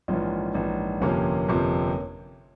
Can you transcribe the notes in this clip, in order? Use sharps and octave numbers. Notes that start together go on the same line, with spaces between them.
A#1 G#2 E3 C#4 F4
A#1 G#2 E3
G1 F2 C3 F3 A#3 C#4
G1 F2 C3 F3